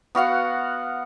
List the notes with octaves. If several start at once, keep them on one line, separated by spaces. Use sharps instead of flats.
B3 F#4 F5 F#5